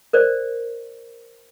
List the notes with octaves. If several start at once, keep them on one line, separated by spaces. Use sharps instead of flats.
A#4 C5 D5